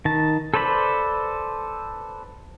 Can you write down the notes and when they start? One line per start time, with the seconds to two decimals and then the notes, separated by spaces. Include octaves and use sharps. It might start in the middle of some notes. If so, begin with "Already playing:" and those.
0.05 D#3 A5
0.54 A4 B4 C5 D5 B5